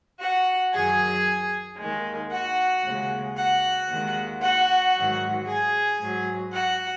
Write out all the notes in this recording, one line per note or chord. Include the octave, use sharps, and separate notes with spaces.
F#4 F#5
F#2 D#3 F#3 G#4 G#5
D#2 D#3 G#3
F#4 F#5
D#2 C#3 G#3
F#4 F#5
D#2 D#3 G#3
F#4 F#5
G#2 D#3 F#3
G#4 G#5
G#2 F#3
F#4 F#5